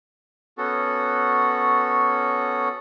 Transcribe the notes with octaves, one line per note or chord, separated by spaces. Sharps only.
B3 C#4 F#4 A4